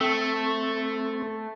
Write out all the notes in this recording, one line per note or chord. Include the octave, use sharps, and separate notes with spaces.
A3 C4 A4